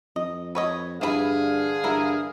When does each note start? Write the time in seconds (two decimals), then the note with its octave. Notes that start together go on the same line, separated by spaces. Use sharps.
0.16 F2 D#5
0.55 B4 C#5 D#5
1.01 G2 D3 E3 F#4 G#4 F5 B5
1.84 G2 E3 E4 A#4